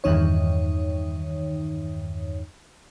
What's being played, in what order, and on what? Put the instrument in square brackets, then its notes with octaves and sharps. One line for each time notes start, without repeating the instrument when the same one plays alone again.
[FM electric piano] E2 G2 D#3 D#4 C#5